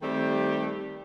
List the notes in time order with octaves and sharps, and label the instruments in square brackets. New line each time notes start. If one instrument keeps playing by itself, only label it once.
[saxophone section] D#3 G3 A3 C4 G4